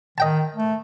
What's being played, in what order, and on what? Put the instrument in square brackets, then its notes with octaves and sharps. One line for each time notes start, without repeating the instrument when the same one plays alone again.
[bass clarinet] D#3 [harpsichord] D#5 G5 A5
[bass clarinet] A3